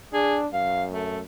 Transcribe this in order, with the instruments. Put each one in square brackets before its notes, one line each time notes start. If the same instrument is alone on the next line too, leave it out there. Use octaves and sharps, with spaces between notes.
[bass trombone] D4 [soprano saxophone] G#4
[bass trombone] F#2 [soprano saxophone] F5
[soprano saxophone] A3